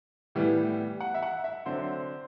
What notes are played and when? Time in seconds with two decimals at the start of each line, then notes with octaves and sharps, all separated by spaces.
0.35 A2 E3 G3 B3
1.01 F#5
1.14 E5
1.23 F#5
1.44 E5
1.65 D3 F#3 C4 C5